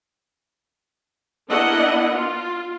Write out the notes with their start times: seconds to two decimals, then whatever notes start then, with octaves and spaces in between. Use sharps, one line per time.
1.50 A#3 B3 D4 E4 D#5 F#5
2.15 F4